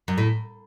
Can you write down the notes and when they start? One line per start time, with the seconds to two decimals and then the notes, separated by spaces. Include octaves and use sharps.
0.08 F#2
0.18 A2